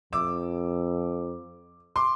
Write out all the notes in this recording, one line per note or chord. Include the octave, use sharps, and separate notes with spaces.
F2 D6 E6
C6 D6